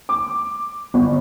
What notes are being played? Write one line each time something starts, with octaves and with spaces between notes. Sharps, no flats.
D6
G1